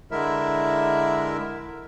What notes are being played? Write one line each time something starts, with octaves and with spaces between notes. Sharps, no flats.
D3 G#3 E4 A#4 E5